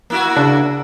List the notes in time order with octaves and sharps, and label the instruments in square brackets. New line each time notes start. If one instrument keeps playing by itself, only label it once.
[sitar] A#3 E4 F#4
[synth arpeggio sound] C#3 D4